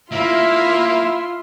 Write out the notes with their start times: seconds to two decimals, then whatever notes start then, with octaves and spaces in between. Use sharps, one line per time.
0.12 A#3 E4 F4 E5